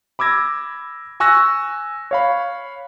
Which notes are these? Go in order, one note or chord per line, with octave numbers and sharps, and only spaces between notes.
B5 D6 E6 G#6 A#6
G#5 C#6 E6 F#6 A#6
C#5 F5 B5